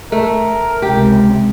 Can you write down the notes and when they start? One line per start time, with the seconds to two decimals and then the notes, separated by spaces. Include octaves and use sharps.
0.12 A3 A#4
0.82 C#2 C3 G4